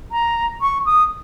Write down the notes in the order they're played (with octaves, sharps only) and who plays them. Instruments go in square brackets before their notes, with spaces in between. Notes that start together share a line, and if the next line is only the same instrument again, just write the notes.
[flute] A#5
C#6
D#6